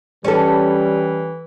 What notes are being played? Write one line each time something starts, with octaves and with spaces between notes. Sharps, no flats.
E3 G3 C#4 A4